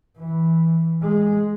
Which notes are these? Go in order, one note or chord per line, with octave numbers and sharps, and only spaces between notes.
E3
G#3